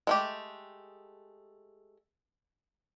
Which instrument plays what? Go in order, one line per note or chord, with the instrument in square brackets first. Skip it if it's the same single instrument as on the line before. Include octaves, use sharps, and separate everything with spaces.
[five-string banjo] G#3 A3 G4